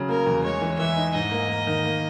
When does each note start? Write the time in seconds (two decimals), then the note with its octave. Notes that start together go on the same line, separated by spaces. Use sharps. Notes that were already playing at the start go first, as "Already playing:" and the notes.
Already playing: C#3 F#3
0.09 A#3 A#4
0.27 E2
0.44 G#3 C#5
0.62 E3
0.79 E3 E5
0.96 D#4
1.15 G#2 D#5
1.31 A#3
1.49 A#3
1.67 D#3
1.84 A#3